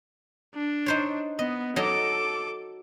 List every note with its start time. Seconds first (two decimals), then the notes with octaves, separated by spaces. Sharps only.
0.54 D4
0.86 D#4 C5 C#5
1.39 B3 D#5
1.76 F#3 D#4 A4 D#5 D6